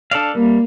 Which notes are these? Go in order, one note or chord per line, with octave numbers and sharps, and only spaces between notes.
D4 A4 D5 F5
G3 A#3